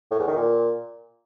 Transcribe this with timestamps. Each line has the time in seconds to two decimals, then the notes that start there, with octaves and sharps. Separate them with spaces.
0.11 A2
0.19 E2
0.28 D#3
0.36 A#2